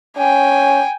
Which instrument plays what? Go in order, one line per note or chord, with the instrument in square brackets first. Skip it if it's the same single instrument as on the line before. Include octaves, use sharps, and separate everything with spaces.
[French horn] C#4 [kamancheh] G5 G#5